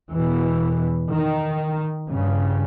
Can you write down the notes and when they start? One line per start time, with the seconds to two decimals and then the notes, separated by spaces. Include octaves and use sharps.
0.11 E2 B2 E3
1.10 D#3
2.09 G2 C#3